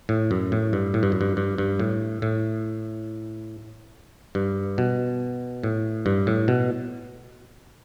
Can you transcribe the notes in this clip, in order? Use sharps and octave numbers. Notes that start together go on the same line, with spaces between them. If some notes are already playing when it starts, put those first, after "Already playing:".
A2
F#2
A2
G2
A2
G2
F#2
G2
G2
G2
A2
A2
G2
B2
A2
G2
A2
B2